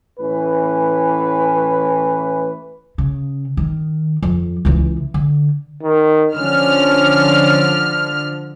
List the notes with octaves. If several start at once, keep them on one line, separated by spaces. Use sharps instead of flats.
A2 E3 C#4 B4
C#3
D#3
F2
C#2 E3
D3
D#3
D3 F3 C#4 F6